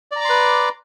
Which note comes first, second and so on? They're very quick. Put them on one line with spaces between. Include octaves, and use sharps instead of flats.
D5 A#5 D6 C6 B4